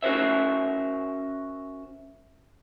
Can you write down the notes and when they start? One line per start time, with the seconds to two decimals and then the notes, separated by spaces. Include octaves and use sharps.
0.03 C#4 F#4 A#4 C5 E5